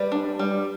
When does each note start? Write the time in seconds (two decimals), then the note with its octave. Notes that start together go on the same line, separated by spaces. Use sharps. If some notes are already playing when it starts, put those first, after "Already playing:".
Already playing: G3 B4 D5
0.12 D4
0.39 G3